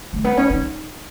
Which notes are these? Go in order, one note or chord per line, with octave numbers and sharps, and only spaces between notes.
A3
B3
C#4
D#4